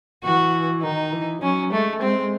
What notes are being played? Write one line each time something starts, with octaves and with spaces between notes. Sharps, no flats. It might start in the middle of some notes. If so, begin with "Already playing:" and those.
E3 F#4
D#3 D#4
E3
F#3 C#4
G#3 A3
G#3 C4